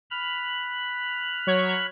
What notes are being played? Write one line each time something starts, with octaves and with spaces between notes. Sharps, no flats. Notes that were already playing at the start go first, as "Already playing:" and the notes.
B5 F6 F#6
F#3 C#5 G#6